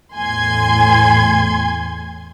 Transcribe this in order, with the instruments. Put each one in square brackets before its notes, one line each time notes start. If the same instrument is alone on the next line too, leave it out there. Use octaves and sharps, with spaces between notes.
[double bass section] E2 A2 [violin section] G#5 C6 G#6